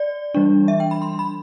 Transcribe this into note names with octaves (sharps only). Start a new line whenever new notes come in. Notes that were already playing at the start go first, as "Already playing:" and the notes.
Already playing: D5
E3 G3 D4
E5
G5
B5
C6
B5